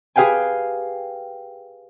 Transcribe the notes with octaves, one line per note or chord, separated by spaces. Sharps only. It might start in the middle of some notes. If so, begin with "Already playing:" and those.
G4 G#4 B4 F5 G5 G#5